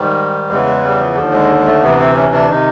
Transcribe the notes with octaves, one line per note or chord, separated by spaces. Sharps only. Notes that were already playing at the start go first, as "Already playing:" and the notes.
Already playing: G#2 D#3 G3
E2 C#3 E3 G#3
G#3
G3
F3
D#2 D3 F3
G#3
G#3
A3
D2 C3 E3 B3
C4
C#4
D4
C3 D#3 D#4